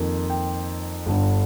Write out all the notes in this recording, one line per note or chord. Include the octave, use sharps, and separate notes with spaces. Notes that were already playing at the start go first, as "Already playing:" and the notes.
Already playing: F2 D#3 A#3
G5
G1 G2 D3